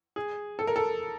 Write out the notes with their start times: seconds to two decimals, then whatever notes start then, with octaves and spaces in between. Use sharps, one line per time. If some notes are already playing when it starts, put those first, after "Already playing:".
0.16 G#4
0.59 A4
0.67 A#4
0.76 A4